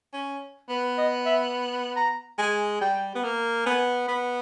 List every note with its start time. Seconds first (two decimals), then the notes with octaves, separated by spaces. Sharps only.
0.13 C#4
0.69 B3 B4
0.98 D#5
1.26 E5
1.96 A#5
2.38 G#3 G#5
2.81 G3 G5
3.15 B3
3.24 A#3
3.66 B3 G#5
4.08 B3 B5